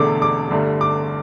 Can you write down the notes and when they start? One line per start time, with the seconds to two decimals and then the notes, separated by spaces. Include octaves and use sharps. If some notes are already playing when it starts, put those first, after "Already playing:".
Already playing: E1 E2 D3 A3 D6
0.22 D6
0.51 G1 G2 D3 A3
0.81 D6